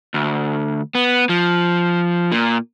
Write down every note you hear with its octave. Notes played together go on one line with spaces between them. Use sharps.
D2
B3
F3
A#2